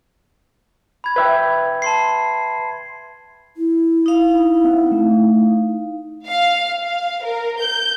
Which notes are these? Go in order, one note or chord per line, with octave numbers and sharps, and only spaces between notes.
B5 G#6
B4 E5 G5 G#6
A5 C6 C7
E4
D#4 F5
C4 E5 F#5
A3
F5
F5
A#4
G6